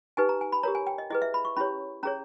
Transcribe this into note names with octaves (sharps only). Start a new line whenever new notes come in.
D#4 G4 B4 G#5
A#5
G#5
B5
G4 A#4 C#5 A#5
G#5
G5
D#5
E4 G#4 B4 D#5
E5
B5
C#6
C#4 E4 G4 C#5 B5
C#4 G#4 C#5 A#5